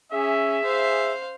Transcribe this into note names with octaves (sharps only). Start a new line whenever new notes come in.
C#4 G#4 E5
C5 F5